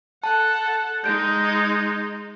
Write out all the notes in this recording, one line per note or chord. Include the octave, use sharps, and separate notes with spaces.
A4 F#5 A5
G#3 D#4 G6 D7